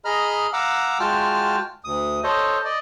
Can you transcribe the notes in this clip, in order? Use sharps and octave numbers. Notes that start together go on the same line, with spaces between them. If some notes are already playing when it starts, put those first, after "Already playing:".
G#4 D#5 A#5 B5 F6
F5 F#5 A#5 D6 E6
G#3 F4 F#4 G5 A5 F6
D2 D#6
A4 C5 C#5 D#5
D5 D#5